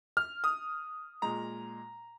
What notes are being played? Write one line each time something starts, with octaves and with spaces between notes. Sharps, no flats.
F6
D#6
A#2 G#3 A#5